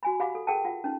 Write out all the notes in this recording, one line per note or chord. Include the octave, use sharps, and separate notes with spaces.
F#4 G#5 B5
G4 F5 F#5 B5 D6
A4
G#4 A#4 F#5 G5 A5
F4 F#5
C#4 D#4